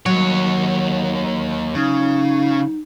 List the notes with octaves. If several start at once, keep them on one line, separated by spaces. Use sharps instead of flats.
D#2 F#3 C#5
C#3 D#4